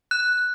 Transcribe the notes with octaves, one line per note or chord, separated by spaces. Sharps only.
F#6